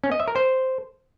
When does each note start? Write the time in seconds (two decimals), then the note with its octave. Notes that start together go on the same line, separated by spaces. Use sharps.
0.04 C#4
0.12 D#5
0.20 E5
0.28 A#4
0.36 C5